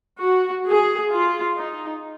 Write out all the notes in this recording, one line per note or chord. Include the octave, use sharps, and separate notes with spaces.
F#4
G#4
F4
D#4